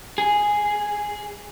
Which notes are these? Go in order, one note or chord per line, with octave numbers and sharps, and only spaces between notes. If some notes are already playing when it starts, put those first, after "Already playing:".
G#4